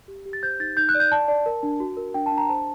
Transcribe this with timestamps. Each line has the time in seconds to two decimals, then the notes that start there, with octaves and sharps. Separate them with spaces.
0.08 G4
0.26 G4
0.33 A6
0.43 C5 G6
0.60 D#4 A6
0.77 D#4 G6
0.89 F#6
0.94 D5
1.00 G6
1.11 D5 A5
1.28 D5
1.46 A#4
1.63 D4
1.80 F#4
1.97 A#4
2.14 D4 G5
2.26 A5
2.32 D4
2.38 A#5
2.49 C5 A5